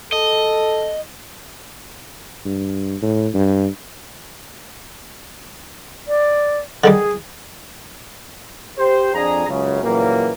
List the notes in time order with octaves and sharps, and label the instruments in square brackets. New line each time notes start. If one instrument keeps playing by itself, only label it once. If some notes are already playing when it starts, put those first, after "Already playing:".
[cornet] A4 [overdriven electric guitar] D#5
[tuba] G2
A2
G2
[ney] D5
[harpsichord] D3 D#3 G3 [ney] G#4
[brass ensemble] G4 C5
F2 D4 G#4 A#5
C#2 F#2 C#3
A#2 C#3 E3 F#3 G3 A#3